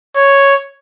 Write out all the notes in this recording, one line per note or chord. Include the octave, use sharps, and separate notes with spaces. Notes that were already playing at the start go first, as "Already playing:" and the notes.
C#5